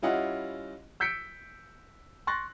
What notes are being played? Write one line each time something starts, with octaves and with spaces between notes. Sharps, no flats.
G3 C#4 E4 F4 D#5 F#5
E6 G6 B6 C#7 D7
C6 C#6 F#6 A6 A#6